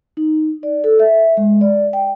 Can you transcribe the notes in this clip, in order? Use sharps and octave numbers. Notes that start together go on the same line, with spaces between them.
D#4
D5
A4
E5
G#3
D5
G5